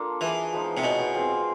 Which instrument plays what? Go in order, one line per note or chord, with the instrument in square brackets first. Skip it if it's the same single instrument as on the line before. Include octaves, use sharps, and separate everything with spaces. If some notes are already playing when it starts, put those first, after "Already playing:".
Already playing: [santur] A#3 D4 F4 A4
[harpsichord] E3 [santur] E4 G#4 B4
[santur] F3 G#3 B3 D#4
[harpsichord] C3
[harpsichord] B2 [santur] E4 G#4 C#5
[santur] C4 F4 G#4